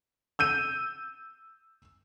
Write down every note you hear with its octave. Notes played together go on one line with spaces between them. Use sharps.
E6 G6 D#7